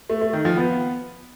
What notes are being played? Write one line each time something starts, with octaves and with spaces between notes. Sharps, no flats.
A3
A3
D#3
F3
B3